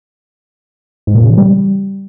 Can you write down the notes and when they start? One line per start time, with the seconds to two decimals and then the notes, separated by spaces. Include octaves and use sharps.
1.07 G#2
1.15 A#2
1.22 C#3
1.30 E3
1.38 G3